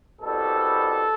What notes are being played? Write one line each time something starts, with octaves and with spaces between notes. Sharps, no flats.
C2 B2 G3 A4